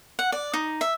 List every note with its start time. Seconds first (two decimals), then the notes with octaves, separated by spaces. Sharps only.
0.19 F#5
0.32 D5
0.53 D#4
0.81 E5